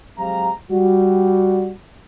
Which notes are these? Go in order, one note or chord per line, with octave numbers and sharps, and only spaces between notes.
F#3 G#3 C4 G4 F5 A#5
G3 F#4